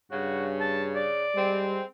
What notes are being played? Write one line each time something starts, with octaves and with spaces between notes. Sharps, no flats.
G2 C#3 F#4
A5
D5
G3 G#3 C4